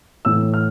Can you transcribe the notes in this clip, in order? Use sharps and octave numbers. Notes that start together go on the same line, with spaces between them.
A2 E3 E6
F6